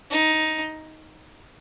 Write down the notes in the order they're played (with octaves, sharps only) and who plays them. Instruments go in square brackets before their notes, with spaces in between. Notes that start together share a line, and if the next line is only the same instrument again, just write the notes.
[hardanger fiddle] D#4